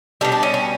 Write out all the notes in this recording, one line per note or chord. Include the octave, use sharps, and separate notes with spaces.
B2 G3 D4
D4
C#4
C#4